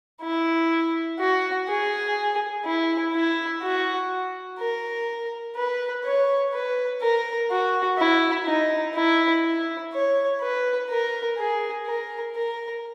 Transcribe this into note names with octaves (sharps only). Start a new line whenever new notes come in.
E4
F#4
G#4
E4
E4
F#4
A#4
B4
C#5
B4
A#4
F#4
E4
D#4
E4
E4
C#5
B4
A#4
G#4
A#4
A#4